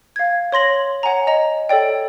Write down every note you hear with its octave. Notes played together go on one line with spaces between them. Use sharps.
F5 G#6
C#5 C6 A#6 F#7
C#5 F#5 G#5 A#5
D#5 A#5
A4 C#5 D5 G5